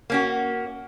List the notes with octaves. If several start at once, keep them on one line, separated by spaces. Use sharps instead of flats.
A#3 C#4 F#4